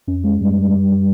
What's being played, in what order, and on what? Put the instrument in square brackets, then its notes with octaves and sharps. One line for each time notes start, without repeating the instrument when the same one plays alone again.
[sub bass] F2 [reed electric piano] C#4
[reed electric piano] G#3
[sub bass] F#2 [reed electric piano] G3
[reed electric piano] G3
G3
G3